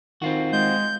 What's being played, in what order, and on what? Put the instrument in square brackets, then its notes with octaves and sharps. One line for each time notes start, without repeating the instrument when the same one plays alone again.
[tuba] D#3 [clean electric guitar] C4 F4 F#4
[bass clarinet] G#3 [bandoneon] G6